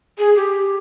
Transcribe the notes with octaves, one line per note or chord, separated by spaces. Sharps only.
G#4
G4